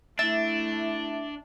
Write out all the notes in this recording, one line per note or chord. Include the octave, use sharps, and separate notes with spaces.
A3 D4 E4 E5 A6